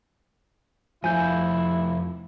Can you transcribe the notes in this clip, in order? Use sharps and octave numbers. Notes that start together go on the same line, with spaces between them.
F2 F3 A3 E4 F5 G#5 G6